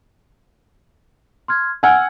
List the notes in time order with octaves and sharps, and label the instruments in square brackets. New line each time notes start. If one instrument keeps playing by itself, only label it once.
[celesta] C6 F6 G#6
[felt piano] F#5 G#5 [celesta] E6 F6 G#6